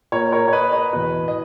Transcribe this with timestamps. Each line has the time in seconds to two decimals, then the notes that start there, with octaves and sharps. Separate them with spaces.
0.12 A#2 A#4 C#5
0.32 A#4 C#5
0.48 C#5
0.53 B4 D#5
0.73 B4 D#5
0.93 E2 B2 B4
1.28 D#5